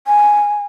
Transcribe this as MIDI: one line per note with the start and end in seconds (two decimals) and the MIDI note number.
0.07 0.65 80